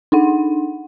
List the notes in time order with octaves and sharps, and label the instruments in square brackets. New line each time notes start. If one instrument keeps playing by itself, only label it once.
[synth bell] D4 D#4 F#5